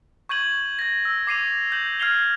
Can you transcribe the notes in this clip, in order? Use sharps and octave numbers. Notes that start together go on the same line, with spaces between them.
C#6 G6 G#6 D#7 F#7
G#6 A#6
E6
D6 C7 D#7 F7
G6 F#7
F6 G#6 C7 F7 G7